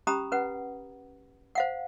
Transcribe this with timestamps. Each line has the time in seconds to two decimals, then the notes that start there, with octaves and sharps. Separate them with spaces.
0.07 C#4 G4 A#5 B5 D#6
0.32 C#4 B4 F#5
1.55 C5 F5 F#5